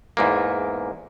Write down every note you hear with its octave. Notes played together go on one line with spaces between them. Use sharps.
E2 G#2 A#3